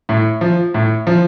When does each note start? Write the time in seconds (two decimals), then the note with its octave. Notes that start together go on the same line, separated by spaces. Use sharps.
0.09 A2
0.41 F3
0.74 A2
1.07 F3